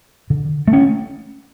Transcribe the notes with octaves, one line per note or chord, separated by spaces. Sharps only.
D3
A3
C#4